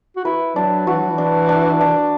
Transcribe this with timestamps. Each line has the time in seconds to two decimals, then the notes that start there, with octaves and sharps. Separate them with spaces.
0.16 F#4
0.25 E4 B4
0.56 F#3 D4
0.87 E3 F#4
0.98 F#3
1.10 E3
1.18 D4
1.49 D4
1.81 D4